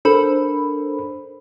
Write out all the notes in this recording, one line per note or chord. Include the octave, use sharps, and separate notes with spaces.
D4 A4 A#4 C5 B5